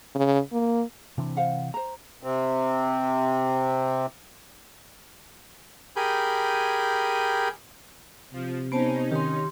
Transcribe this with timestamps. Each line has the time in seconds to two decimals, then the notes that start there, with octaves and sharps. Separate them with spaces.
0.15 C#3
0.52 A#3
1.18 C3 E3 C4 D4
1.37 C5 F5 F#5
1.74 C5 A#5
2.23 C3 C4
5.96 G4 G#4 A#4 G#5 B5 G6
8.33 C3 F3
8.72 B3 C#4 D#4 C5 A5
9.12 D#3 G4 C6